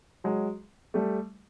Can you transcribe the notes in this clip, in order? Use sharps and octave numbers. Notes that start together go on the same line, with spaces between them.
F#3 G#3
G3 A3